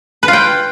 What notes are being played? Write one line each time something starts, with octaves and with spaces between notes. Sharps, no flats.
B4
F4
G5